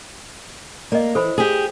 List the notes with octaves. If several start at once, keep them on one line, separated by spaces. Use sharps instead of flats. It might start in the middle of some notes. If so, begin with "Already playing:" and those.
A#3 D5 D#5
E3 A4 C5 B5
G4 G#4